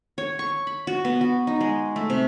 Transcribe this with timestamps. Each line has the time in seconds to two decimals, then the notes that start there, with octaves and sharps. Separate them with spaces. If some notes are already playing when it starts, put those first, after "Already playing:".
0.18 C#5
0.39 C#6
0.67 B5
0.87 F#4
1.05 B3
1.21 F#4
1.47 D#4
1.61 G#3
1.96 A3
2.10 C3